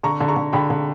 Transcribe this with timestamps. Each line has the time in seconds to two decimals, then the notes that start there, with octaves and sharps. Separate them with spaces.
0.03 D3 A#5 C#6
0.20 D3
0.28 A#5 C#6
0.36 D3
0.53 D3 G5 B5
0.70 D3